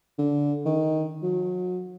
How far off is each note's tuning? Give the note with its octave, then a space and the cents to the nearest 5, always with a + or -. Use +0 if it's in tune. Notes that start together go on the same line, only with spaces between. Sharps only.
D3 -20
D#3 +10
F#3 -35